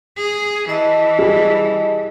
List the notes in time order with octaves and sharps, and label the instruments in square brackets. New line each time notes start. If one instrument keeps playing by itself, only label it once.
[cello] G#4
[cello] E3 [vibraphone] D#5 A5
[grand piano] G3 G#4